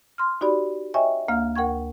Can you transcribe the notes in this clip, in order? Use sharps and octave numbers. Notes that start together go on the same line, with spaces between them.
C6 F6
D#4 F#4 G4 D5 B5
C#5 D#5 E5 G5 G#5 C#6
D2 A#3 F5 F6
D2 A#4 F#5 G5 C#6 G#6